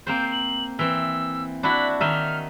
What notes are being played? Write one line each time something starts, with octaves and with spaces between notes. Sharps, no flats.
A#3 C4 C5 G6
F#7
E3 C4 E6
D4 E4 F#4 B5
D#3 D#4 E5 F6